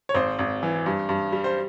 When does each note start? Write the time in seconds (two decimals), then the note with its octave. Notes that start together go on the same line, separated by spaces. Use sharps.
0.09 C#5
0.14 G#1 C5
0.39 G#1
0.63 E3
0.86 G2
1.09 G2
1.32 G3
1.44 C5